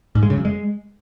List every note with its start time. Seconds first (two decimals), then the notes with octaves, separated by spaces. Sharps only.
0.15 G#2
0.23 G#3
0.30 C#3
0.37 F#2
0.45 G#3